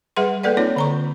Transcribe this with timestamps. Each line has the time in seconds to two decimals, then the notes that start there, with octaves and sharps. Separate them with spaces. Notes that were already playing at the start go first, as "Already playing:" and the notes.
0.16 G3 G#4 B4 E5 F#5 C6
0.43 A#3 A4 B4 D5 F#5
0.57 A#3 C4 D#4 F4 C#5
0.76 D3 A#5 C#6